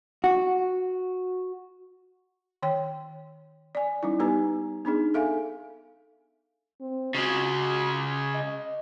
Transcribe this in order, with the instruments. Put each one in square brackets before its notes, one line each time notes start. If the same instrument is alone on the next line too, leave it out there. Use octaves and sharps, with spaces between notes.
[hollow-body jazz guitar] F#4
[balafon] D#3 C#5 G5
D5 G#5
G3 C#4 D#4 E4
B3 D#4 G4 B4 G#5 A#5
B3 D4 D#4 G#4
A4 E5 F5 G#5
[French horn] C4
[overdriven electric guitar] C#3 G#3 [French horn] F#4
[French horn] D#5